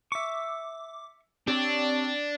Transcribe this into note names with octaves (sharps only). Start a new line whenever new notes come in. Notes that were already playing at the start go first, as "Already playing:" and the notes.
E5 C#6 D6
C4 D4 G4 C#5 D5